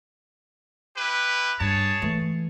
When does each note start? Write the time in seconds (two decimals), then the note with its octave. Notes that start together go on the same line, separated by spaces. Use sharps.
0.97 E4 G4 B4
1.60 G2 G#4 C#5 A5
2.02 E3 A3